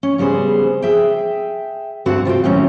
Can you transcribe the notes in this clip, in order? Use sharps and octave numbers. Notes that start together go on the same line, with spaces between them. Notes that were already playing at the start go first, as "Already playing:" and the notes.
C#4
C#3 G3 B3 G#4 C5
G#4 E5 G5
D2 G2 D3 C4 F#4 F#5
C3 F4 E5 G5
A2 D#3 F#3 C4 C#4 C#5